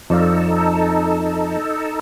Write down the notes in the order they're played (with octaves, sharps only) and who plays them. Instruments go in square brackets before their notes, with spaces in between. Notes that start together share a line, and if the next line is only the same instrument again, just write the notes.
[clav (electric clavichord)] F2 D5 F5 [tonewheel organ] D#4 A4